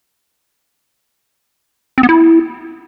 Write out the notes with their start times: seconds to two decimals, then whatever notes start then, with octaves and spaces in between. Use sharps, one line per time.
1.98 C4
2.03 B3
2.09 E4